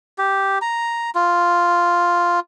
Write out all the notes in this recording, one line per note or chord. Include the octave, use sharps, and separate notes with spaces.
G4
A#5
F4